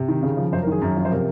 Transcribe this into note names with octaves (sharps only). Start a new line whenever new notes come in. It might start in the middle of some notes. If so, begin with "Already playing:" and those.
Already playing: C3
D#3
C#3
F3
F#2 C5
A#4
D#3 G#4
F#2
F3
C5
C3 A#4